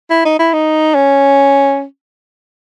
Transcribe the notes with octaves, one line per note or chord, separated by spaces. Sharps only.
E4
D#4
E4
D#4
C#4